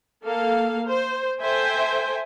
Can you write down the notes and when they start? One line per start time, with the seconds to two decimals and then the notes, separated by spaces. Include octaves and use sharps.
0.24 A#3 A4 F5
0.87 C5
1.39 A4 C5 E5 G5 G#5